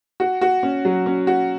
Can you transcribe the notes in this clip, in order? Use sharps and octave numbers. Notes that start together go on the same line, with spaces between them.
F#4
F#4
C#4
F#3
C#4
F#4